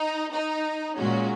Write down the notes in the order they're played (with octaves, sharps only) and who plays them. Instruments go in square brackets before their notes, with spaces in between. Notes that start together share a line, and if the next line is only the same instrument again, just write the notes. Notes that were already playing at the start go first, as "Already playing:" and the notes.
Already playing: [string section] D#4
D#4
A#2 G#3 C#4 F#4